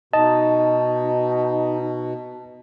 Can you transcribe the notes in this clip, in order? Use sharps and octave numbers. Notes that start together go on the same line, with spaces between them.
B2 D#4 D#5 A5